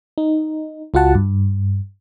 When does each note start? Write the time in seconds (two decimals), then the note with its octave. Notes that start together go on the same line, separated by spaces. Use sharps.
0.18 D#4
0.94 C#2 F4 F#4 F#5 A5
1.15 G2